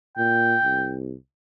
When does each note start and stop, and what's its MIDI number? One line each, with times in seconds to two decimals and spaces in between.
0.17 0.56 46
0.17 0.93 79
0.63 1.15 36